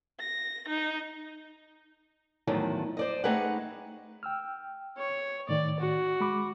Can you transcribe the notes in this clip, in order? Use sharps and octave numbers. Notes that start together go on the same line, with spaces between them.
A#6
D#4
E2 A2 D#3 F3 F#3
C5 D5 D#5
A3 C4 D#4 G#4 B4 F#5
G5 E6 F6
C#5
A2 D#3 D5
F#4
G#3 B5 D6